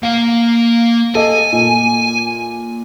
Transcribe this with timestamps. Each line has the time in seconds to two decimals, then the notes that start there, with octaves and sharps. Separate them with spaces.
0.03 A#3 F5 A#5
1.15 A4 D#5 G#5
1.53 A#2